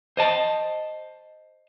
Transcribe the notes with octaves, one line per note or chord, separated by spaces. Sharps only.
C5 D#5 A5